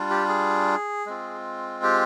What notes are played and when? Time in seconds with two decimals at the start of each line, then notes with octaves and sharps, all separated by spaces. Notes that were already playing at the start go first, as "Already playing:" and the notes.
Already playing: G3 D4 F4
0.10 G4
0.29 G#4
1.06 G#3 C4 F4
1.83 G4